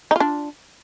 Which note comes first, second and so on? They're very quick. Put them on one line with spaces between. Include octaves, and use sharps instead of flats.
D#4 F4 D4